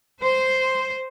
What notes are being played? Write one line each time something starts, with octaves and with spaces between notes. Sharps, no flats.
C5